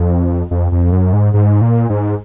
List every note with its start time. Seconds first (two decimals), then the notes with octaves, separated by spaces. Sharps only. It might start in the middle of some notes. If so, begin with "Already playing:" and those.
Already playing: F2
0.51 F2
0.72 F2
0.92 F#2
1.13 G#2
1.34 G#2
1.61 A#2
1.90 G#2